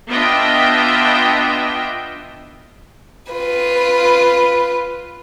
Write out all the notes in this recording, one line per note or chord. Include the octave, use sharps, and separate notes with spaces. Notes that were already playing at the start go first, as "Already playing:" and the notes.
B3 D4 F4 D#5 E5 G5
F4 B4